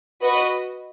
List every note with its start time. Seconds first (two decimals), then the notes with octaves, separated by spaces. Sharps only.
0.22 F#4 B4 D#5